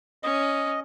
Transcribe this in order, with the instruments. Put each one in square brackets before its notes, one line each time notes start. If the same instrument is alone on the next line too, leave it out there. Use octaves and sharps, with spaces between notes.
[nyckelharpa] C#4 [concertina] D#5